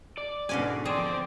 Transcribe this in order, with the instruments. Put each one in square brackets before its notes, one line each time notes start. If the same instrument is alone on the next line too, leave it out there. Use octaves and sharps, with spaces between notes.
[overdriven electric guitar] D5
[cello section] G#2 B2 E3 [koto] D3 C#4 G#5
[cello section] D3 F3 [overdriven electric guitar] C4 C5 [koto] G#4 [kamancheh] D5